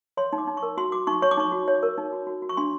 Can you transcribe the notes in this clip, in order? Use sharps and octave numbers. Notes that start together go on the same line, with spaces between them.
C#5 C6
D#4
D6
D#4
C#6
A#4
F#4 C6
F#4 D6
D#4 C#6
C#5 C#6
D6
D#4 C#6
F#4
C#5
A#4
D#4
F#4
F#4
F#4
C#6
D4 C6